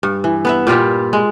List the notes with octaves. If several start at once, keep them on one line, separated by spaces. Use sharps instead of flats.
G2
E3
B3 B4 E5
A#2 G3 F4 G4
G#3